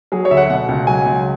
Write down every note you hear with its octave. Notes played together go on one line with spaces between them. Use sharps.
F#3 G#4
C#5
D2 E5
F#5
B2 F#5
C#2
F#3 G#5
C#2